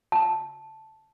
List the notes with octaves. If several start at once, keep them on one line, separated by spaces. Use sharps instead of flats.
A5